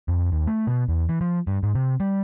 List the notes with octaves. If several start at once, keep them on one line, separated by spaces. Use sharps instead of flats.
F2
D#2
A3
B2
E2
E3
F3
G2
G#2
C3
G3